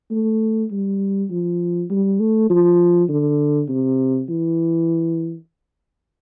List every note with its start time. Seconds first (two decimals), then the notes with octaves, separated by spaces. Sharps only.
0.11 A3
0.71 G3
1.30 F3
1.90 G3
2.20 A3
2.50 F3
3.09 D3
3.69 C3
4.29 E3